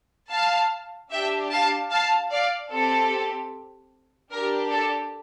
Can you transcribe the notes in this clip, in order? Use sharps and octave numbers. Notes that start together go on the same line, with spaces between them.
F5 A5
D4 G4 E5 G5
F5 A5
F5 A5
D5 F5
C4 G4 A4
D4 G4 A#4
A4